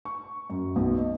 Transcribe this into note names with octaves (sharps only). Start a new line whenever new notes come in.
C#6
F#2
B1
D#5